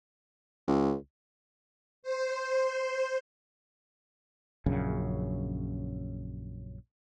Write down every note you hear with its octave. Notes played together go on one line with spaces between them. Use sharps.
C#2
C5
A#1 F#2 C#3